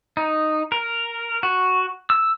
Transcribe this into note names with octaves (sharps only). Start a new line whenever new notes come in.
D#4
A#4
F#4
E6